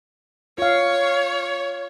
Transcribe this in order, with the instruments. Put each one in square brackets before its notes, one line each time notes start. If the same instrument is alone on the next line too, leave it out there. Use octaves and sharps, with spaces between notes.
[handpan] F4 F5 [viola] C#5